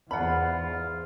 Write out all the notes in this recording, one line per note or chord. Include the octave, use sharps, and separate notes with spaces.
E2 G#2 F4 F#5 B5